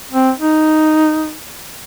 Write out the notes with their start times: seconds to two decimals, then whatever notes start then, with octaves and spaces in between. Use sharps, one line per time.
0.12 C4
0.39 D#4